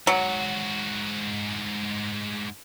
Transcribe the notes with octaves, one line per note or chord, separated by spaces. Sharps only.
G#2 F#3 F#4